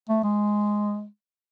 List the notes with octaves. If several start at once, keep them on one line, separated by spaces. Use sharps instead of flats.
A3
G#3